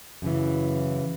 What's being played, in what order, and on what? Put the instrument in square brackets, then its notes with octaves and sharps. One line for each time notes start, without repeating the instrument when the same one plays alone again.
[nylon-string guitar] F#2 C#3 E3